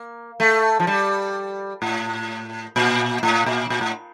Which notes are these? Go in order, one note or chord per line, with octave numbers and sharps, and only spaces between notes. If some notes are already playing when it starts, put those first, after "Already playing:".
Already playing: A#3
A3
F3
G3
A2
A#2
A2
A#2
A#2
A2